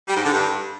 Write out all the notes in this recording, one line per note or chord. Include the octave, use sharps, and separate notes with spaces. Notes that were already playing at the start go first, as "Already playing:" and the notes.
G3
G#2
D3
G2